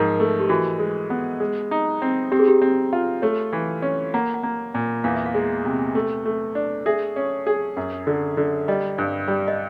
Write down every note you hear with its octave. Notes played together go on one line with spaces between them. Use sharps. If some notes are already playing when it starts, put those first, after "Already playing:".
Already playing: G#2 F3 A#4
A3
G4
E3 F#4
G#3
B3
G#3
D#4
C4
C4 G4
G#4
G4
C4
F4
A3 C#5
E3
C#4
A#3 F#5
F#5
A#3
A#2
E2 F5
E5
F5
G#3
C3
A3
A3
D4
G#4 E5
C#4
G#4
F#2
D3
D3
G3 D#5
G2
G3
D#5